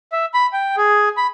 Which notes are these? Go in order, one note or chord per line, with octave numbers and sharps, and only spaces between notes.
E5
B5
G5
G#4
B5